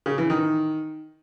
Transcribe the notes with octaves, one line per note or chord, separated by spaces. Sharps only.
C#3
E3
D#3